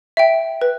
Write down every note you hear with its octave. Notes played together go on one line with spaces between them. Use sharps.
E5 G5
B4